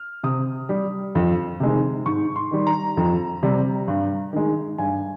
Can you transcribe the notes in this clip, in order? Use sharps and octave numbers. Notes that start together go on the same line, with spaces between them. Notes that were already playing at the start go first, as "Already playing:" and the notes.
Already playing: F6
C3 D#6
G3
F2
C3 D#3 G#3
G#2 C#6
C6
D#3 G3
A#5
F2
C3 G3
G2
D#3 G#3
G2 G#5